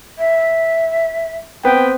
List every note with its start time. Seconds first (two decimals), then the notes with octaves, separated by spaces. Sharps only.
0.18 E5
1.65 B3 C4 G5